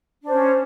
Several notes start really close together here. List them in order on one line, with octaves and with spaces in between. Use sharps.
D4 C5 C#4